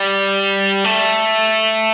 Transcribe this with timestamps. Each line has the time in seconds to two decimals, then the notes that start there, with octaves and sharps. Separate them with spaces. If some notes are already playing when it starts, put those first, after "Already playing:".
Already playing: G3
0.84 A3